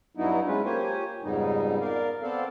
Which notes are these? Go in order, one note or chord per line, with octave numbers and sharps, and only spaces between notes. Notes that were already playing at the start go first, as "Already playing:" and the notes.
G2 F#3 B3 D#4 E4
G#3 C#4 F4 B4
A#3 F4 G4 C5 C#5 G#5
F2 G#2 C#3 G3 B3 D#4
A#4 D5 F5
B3 C4 A4 D5 F5